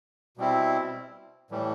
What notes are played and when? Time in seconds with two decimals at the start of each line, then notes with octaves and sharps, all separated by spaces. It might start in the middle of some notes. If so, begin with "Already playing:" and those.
0.37 B2 G3 C4 E4
1.51 A2 E3 G3